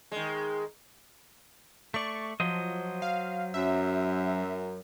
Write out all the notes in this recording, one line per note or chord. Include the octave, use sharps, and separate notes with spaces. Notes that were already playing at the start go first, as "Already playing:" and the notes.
D#3 G#3
A3 D5 C#6
F3 F#3 C5 D#5
F5
F#2 E5